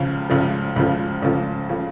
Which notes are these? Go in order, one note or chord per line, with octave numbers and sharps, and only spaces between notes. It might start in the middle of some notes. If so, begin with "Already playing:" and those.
Already playing: C#2 C#3 F3
C#2 C#3 F3
C#2 C#3 F3
C#2 C#3 F3
C#3 F3